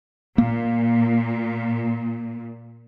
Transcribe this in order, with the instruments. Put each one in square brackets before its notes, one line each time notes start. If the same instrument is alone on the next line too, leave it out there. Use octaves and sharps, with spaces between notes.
[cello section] A#2 [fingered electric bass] A#3